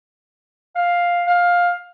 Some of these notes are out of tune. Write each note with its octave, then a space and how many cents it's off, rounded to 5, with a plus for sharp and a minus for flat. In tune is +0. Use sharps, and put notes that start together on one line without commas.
F5 +5
F5 +15